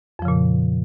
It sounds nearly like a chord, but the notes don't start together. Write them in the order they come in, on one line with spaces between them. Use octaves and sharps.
F2 F3 C#3 A#2